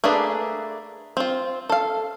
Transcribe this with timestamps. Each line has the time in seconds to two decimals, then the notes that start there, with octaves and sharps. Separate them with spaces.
0.04 A3 A#3 D4 G#4 B4
1.17 C4 F4
1.69 A4 F5